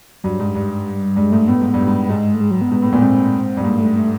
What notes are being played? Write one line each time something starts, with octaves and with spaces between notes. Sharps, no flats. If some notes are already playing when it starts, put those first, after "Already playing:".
G2 F#3
G#2 G3
G2
G2 G#3
G#2 A3
A2 B3
G#2
G2
G#2
G#2 G#3
A3
G#3
F#3
B3
G#2
A2
A#2 B3
G#2 C4
G2
G#2 A#3
A3
A3